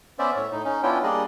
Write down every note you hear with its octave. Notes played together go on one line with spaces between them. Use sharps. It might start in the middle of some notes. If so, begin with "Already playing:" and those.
B3 C#4 C5 D5 E5
A2 C#5 E5
A2 D#4
C#4 D#4
B3 C#4 D4 E4 F4 G5
G3 A#3 D4 G#4 D5 D#5